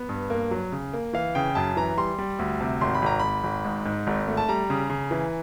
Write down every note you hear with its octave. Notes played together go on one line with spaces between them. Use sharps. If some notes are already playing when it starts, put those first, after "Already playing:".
Already playing: B3
G2
A#3
F#3
C#3
A#3
E3 F5
C#3 G5
F#2 A5
E3 A#5
G3 C6
G3
D2
C3
G#1 C6
B5
G#1 A#5
G#1 B5
G#1
G#2
G#2
G#1
A3
A5
G3 A#5
C#3
C#3
E3